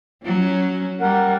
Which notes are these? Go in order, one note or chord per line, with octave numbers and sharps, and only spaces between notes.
F#3 C#4
G3 A#4 F#5